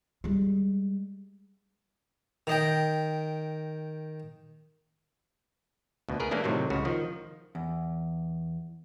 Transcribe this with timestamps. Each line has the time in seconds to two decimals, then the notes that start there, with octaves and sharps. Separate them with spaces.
0.24 G3 G#3
2.47 D#3 D#5 G5
6.09 D2 B2
6.20 G#4 A#4 B4
6.31 E3 A3 A#3 C#4 D4 E4
6.44 A2 C3 D#3 F#3
6.70 C#2 C#3 F#4
6.85 D#3 F3
7.55 E2